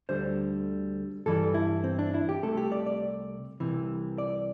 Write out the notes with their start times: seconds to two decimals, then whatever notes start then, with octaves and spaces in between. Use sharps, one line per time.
0.09 D2 D3 G3 C5
1.26 G2 E3 G3 A4
1.54 E4
1.84 C4
1.99 D4
2.14 E4
2.29 G4
2.43 C2 C3 A3 A4
2.57 G4
2.72 D5
2.86 D5
3.60 C2 C3 E3
4.18 D5